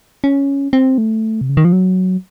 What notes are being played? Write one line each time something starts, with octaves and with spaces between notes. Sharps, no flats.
C#4
C4
A3
C3
C#3
D#3
F3
F#3